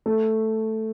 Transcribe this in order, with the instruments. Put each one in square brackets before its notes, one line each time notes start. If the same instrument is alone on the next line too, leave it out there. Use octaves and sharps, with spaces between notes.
[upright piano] A3